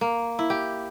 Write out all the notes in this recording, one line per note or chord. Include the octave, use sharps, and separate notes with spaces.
A#3
E4
G4